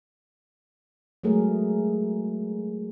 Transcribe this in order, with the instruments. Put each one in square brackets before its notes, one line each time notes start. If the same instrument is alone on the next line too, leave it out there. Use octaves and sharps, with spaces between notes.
[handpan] F#3 G#3 A3 G#4 A#4